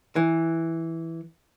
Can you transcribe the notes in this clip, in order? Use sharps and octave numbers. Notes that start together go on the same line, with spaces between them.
E3